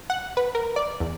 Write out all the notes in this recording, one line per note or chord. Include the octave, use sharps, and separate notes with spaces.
F#5
B4
A#4
D5
E2